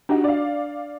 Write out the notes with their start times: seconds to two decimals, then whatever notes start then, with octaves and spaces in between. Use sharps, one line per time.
0.09 D4 D#4 F#4 G4
0.24 D5 F5